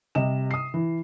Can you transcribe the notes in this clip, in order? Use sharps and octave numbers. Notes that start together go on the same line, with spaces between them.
C3 G3 D#5 E7
D#6 C7
E3